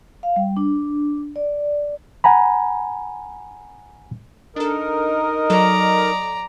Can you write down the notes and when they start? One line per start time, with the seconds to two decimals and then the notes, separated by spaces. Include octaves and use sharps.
0.23 F5
0.36 G3
0.57 D4
1.36 D5
2.24 F#5 G#5 A#5 B5
4.56 D4 D#4 A4 A#4 D#5
5.50 F#3 A4 D5 A#5